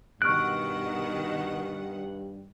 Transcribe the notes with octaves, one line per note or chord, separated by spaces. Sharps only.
G2 B2 D#3 F#5 C#6 F6 F#6 D7